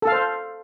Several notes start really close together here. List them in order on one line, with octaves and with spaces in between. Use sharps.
A4 F5 C5